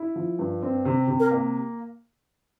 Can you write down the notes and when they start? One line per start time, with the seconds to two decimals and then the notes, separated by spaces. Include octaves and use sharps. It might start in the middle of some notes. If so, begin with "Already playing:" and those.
Already playing: E4
0.16 F3
0.39 G2
0.62 C4
0.85 C3
1.08 C3
1.20 A#4
1.31 A#3